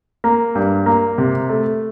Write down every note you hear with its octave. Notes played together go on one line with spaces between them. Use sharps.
A#3
G2
A#3
C3
A3